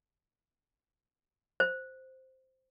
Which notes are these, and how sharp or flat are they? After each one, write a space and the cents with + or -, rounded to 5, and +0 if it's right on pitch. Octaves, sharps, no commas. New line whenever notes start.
C5 +0